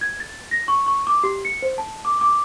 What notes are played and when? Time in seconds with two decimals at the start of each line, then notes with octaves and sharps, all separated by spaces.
0.01 G#6
0.20 A6
0.51 A#6
0.68 C#6
0.86 C#6
1.07 D6
1.23 G4
1.45 C#7
1.62 C5
1.78 A5
2.05 D6
2.21 D6